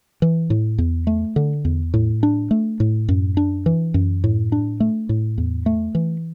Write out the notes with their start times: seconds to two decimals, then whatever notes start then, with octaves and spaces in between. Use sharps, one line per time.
0.22 E3
0.50 A2
0.78 E2
1.07 A3
1.36 D3
1.65 E2
1.94 A2
2.23 D4
2.51 A3
2.80 A2
3.09 F#2
3.37 D4
3.66 E3
3.94 F#2
4.24 A2
4.52 D4
4.80 A3
5.09 A2
5.38 E2
5.66 A3
5.95 E3